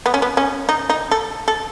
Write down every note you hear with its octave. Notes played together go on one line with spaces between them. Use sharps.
B3
C#4
B3
C#4
D#4
D#4
A4
A4